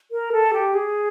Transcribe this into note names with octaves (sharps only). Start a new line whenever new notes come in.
A#4
A4
G4
G#4